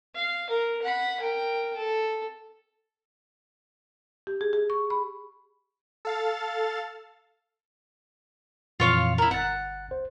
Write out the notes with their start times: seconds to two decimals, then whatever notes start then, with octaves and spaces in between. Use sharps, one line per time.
0.15 F5
0.50 A#4
0.82 F#5 B5
1.20 A#4 G5
1.76 A4
4.27 G4
4.41 G#4
4.53 G#4
4.70 C#6
4.90 B5
6.05 A4 F5 A6
8.80 F2 A#2 E3 F4 C#5 F5
9.18 E4 A#4
9.31 G1 F#5 A6
9.91 C5